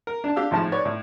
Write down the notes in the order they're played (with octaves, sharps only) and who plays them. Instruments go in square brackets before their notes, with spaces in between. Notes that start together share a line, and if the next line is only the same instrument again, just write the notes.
[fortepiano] A#4
D4 A5
D4 G4 F5 E6
G#1 A2 F3 A5
B4 C#5 D5
A2